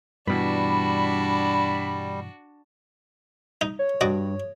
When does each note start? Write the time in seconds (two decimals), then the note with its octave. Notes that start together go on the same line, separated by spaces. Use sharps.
0.27 G2 B2 E3 G3 D4 F#4 B5
3.61 D#4
3.79 C#5
4.01 G2 F#4 D5 D#5